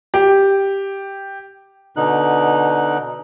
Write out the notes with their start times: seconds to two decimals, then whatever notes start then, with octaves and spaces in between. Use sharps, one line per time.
0.14 G4
1.96 B2 D3 D#4 F#6